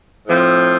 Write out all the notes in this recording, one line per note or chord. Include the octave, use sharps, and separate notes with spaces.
A2 F3 C4